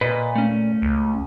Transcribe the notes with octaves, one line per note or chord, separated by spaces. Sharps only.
A#2 B4 D#5
A3 C#4
C#2